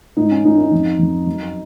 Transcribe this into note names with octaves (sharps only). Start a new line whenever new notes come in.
G#2 D#4
C#4
G#2 D#4
D#4
F2
F2
F#2